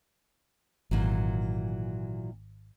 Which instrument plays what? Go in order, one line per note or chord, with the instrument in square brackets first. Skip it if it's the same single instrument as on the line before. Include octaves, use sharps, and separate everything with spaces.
[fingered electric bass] G#1 [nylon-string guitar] A#2 E3 F#3